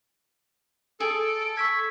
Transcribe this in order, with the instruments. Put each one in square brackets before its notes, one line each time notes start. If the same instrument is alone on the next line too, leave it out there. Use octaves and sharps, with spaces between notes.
[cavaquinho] G#4 [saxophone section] A4 [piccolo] D7
[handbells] C#6 E6 G#6 [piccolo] B6